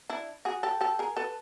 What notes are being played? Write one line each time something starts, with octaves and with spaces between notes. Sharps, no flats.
D4 E4
F#4 G#4
G4 A4
G4 A4
G#4 A#4
A4 B4